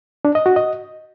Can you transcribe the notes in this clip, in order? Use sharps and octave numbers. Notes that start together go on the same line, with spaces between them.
D4
D#5
F#4
D#5